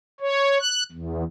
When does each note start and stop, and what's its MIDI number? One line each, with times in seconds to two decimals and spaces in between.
0.20 0.58 73
0.60 0.83 90
0.92 1.24 40